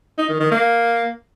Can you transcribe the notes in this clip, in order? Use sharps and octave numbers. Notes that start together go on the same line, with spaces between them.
D#4
D#3
D#3
A#3